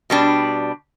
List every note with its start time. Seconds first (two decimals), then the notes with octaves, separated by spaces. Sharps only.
0.10 B2 G3 D4